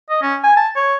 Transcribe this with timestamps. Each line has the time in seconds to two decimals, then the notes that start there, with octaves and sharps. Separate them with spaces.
0.10 D#5
0.22 C#4
0.44 G#5
0.57 A5
0.76 C#5